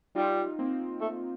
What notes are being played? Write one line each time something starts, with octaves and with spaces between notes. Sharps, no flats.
G3 D#4 F4
A#3 C4
A3